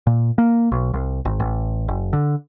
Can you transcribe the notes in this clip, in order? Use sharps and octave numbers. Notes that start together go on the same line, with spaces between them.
A#2
A#3
B1
C2
G#1
A1
F#1
D3